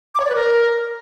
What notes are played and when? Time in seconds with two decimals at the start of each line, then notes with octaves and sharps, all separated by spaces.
0.15 D6
0.20 C#5
0.25 D5
0.30 B4
0.35 A#4